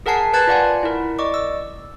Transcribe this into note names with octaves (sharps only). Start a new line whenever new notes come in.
G#4 A#4 F#5 G#5 A5 C7
B4 A5 F#6 G#6 A6
F4 D5 F#5 G#5
E4 A#4
D5 D#5 C#6 D6
E6